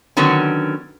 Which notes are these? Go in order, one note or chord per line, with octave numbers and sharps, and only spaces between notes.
D3 D#3 F#3 B3 C#4